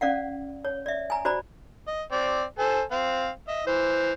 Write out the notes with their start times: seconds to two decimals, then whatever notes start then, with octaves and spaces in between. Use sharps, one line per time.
0.01 C#4 D5 F5 F#5
0.65 C#5
0.86 D5 E5
1.10 G#5 A#5
1.25 F#4 C5 D5 A#5 B5
1.87 D#5
2.12 C4 D5
2.59 A4 C5 G#5
2.92 C4 F5
3.48 D#5 E5
3.67 E3 C5